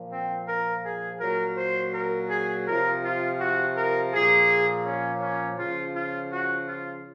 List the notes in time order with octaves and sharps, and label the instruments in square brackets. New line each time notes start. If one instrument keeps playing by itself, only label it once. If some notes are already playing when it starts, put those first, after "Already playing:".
Already playing: [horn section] A#2 F3
C4
A#4
G#4
A#2 F#3 A#4
C5
A#4
G#4
C3 F3 A#4
F4
F#4
A#4
A#2 F3 G#4
C#4
C#4
C#3 F3 F4
F4
F#4
F4